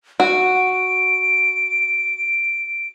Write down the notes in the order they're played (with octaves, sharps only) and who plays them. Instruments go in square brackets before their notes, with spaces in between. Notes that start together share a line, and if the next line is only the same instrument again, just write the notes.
[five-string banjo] F#4 [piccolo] D7